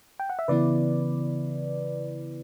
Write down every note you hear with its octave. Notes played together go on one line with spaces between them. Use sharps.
G5
F#5
E5
C#3 E3 B3 E4 B4 D5